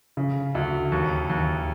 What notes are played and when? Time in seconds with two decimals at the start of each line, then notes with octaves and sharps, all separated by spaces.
0.17 C#3
0.55 D2
0.92 D#2
1.30 D#2